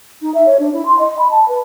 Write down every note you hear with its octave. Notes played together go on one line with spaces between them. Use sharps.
D#4
E5
C#5
D4
E4
C6
D#5
B5
A5
B4